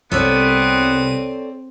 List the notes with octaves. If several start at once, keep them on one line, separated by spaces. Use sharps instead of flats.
C2 B3 C4 A4 C#5 D5 D#7